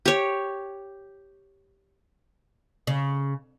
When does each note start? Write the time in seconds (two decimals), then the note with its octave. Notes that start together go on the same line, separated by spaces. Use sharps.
0.05 G4 C#5
2.87 C#3